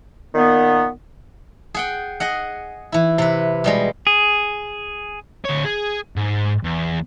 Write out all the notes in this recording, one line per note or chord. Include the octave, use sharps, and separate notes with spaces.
A#2 D#3 B3
G#4 F#5 G5
G#4 D#5 F#5
E3 E4
C3 B4
B2 G3 G#3
G#4
D2 C#5
G#4
G#2
E2